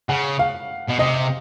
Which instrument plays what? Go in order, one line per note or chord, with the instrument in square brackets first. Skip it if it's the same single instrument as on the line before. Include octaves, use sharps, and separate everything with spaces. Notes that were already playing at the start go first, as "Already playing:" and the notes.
[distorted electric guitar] C#3 [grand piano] F#5
[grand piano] F5
[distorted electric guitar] B2
[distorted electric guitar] C3 [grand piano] D#5